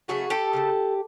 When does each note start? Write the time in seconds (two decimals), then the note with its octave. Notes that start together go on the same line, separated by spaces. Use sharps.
0.08 C#3 F#3 A3 F#4 G#4
0.30 G4 A4
0.53 C#3 F#3 A3